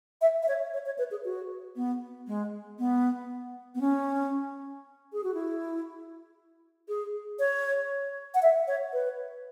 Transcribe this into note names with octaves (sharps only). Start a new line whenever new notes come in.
E5
E5
C#5
C#5
C#5
B4
G#4
F#4
B3
G#3
B3
B3
C#4
G#4
F#4
E4
G#4
C#5
F#5
E5
C#5
B4